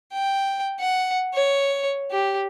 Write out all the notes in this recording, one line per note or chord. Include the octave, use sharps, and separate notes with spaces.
G5
F#5
C#5
G4